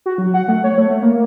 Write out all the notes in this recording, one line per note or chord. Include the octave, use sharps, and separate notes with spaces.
F#4
F#3
F#5
A3
C#5
A3
A3
A#3